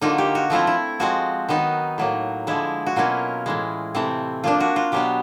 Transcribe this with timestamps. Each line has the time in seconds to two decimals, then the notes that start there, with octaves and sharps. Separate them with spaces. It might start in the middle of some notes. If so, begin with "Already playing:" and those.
0.01 D3 F#3 A#3 D#4 F4
0.18 G4
0.35 F#4
0.50 F3 A3 C4 E4 F4
0.67 E4
1.00 F3 G#3 C4 F#4
1.49 D#3 F#3 B3 D#4
1.98 A2 F#3 A#3
2.47 D3 F3 G#3 E4
2.86 F#4
2.96 B2 F#3 A#3 C#4 E4 F4
3.46 A2 E3 G#3
3.95 C3 E3 A3 C4
4.44 F3 A#3 D4 F4
4.60 F#4
4.76 F4
4.92 B2 F#3 B3 G4